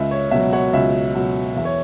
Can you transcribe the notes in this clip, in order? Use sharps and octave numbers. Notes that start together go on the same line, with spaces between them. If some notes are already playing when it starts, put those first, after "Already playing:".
Already playing: C#2 E5
C#5
B2 F#3 E5
C#5 F#5
C#2 E5
B2 F#3
E2 E5
C#5